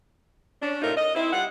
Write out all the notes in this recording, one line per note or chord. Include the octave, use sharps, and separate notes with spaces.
C#4 D4
A2 C3 D#4 F4 A#4
D#5
C4 E4
G3 F4 F#5